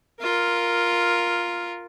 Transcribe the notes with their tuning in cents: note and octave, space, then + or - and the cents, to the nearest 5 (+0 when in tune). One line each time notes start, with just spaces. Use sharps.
F4 +0 A#4 +0